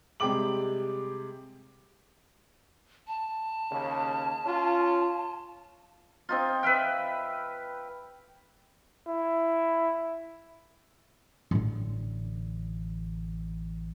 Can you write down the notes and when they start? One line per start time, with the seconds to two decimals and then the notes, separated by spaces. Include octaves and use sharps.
0.20 C3 G3 G#3 G5 D6 F#7
3.08 A5
3.71 D#2 C#3
4.46 C#4 F4
6.29 C4 D#4 F4
6.63 B4 E5 F5 G5
9.07 E4
11.51 A1 D3